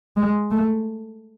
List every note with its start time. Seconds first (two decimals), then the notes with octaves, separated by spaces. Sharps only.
0.16 G#3
0.51 A3